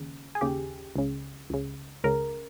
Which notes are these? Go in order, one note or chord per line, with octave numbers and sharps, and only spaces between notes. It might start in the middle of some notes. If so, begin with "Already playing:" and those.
Already playing: D#2 C#3
G#4
D#2 C#3 G4
C#2 C#3
C#2 C#3
C#2 C#3 A#4